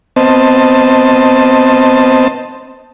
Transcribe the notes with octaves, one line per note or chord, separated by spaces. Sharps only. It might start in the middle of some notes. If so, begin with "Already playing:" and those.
B3 C4 C5 D#5 A5